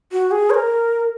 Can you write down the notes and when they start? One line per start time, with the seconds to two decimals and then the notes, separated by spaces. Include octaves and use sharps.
0.12 F#4
0.31 G#4
0.50 C#5
0.54 A#4